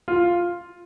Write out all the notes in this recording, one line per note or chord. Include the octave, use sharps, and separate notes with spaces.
F4